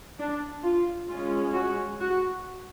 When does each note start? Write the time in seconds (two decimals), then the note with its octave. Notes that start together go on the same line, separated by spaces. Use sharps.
0.18 D4
0.63 F4
1.08 G#3 C#4 F4
1.54 F#4
2.00 F#4